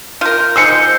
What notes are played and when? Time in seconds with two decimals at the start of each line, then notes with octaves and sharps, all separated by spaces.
0.21 F4 A#4 G6
0.56 F3 G#3 D#4 C5 E6 G6 C7 C#7